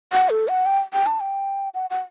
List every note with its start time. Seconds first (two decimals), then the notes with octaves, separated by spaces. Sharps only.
0.13 F#5
0.30 A4
0.48 F#5
0.66 G5
0.93 G5
1.06 A5
1.20 G5
1.74 F#5
1.90 F#5